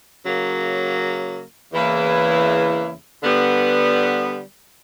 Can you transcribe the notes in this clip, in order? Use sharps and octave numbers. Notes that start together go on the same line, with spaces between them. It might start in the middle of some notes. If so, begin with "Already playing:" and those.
C#3 F#3 A#3
E2 C#3 E3 A#3 E4
D3 G3 B3